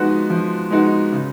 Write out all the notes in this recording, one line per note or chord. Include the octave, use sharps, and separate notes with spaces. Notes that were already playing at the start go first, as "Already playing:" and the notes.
Already playing: F3 G#3 B3 D#4 F#4
F3
G#3 B3 D#4 F#4
C#3